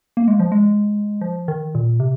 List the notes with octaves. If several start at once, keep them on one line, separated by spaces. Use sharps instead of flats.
A#3
G#3
F3
G#3
F3
D#3
A#2
C3